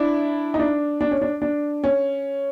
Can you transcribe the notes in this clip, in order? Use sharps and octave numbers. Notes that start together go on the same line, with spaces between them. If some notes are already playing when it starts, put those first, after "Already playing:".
Already playing: D4 E4
D#4
D4
D4
C#4
D4
D4
C#4